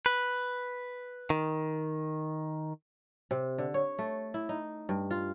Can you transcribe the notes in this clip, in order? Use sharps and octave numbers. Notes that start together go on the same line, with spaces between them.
B4
D#3
C3
D3
C#5
A3
E4
D#4
G2
F4